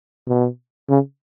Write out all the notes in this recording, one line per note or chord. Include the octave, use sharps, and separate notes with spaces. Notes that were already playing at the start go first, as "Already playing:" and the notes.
B2
C#3